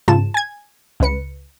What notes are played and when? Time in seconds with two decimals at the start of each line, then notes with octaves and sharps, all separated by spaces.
0.08 G#2 C#3 F4 A5 E7
0.34 G#5 G#6
1.00 C#2 C#3 B4 C#7